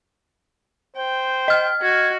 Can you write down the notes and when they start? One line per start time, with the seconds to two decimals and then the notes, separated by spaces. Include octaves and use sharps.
0.97 C5 G5
1.48 D#5 F6
1.82 F#4 G#6